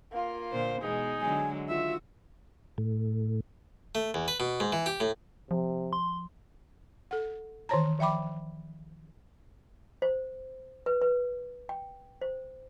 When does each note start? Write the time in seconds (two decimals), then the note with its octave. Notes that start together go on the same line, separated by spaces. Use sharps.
0.12 A#3 F4
0.52 A#2 D3 C5
0.83 E2 B2 G#3 D#4 G#4
1.21 D3 F#3 G#3 G#5
1.69 D#3 F4 F#4 E5 E6
2.78 A2
3.95 A3
4.14 E2
4.28 B4
4.40 B2
4.60 G#2
4.72 E3
4.86 G4
5.00 A2
5.51 C3 F3
5.93 C6
7.11 A4 F#5
7.69 D#3 E3 C5 C#5 A5 A#5
7.99 F3 E5 G5 B5 D6
10.02 C5
10.86 B4
11.02 B4
11.69 G5
12.21 C5